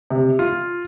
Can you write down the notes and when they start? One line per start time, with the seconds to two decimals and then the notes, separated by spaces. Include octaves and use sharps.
0.10 C3
0.39 F4